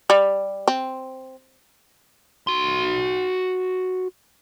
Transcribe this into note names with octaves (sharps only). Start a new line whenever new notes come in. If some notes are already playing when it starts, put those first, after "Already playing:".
G3
C4
F#4 C6